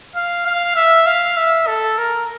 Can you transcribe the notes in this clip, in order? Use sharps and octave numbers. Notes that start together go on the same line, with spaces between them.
F5
F5
E5
F5
E5
A4
A#4